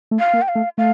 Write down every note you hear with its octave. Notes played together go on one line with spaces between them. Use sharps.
A3
F5
A#3
G5
F5
A3
A3 F5